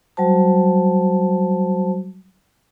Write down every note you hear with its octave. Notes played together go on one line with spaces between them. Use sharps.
F#3 G3 F#4 C5 A5